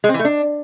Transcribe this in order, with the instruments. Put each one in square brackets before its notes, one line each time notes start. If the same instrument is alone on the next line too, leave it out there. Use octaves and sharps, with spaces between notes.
[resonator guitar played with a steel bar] G#3
C4
E3
A3
D4